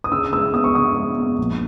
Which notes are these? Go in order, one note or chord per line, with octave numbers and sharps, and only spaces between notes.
D#6
C#3 E6
G#3 E6
B3 D#6
C#6
C#3 D#6
G#3
B3
A#1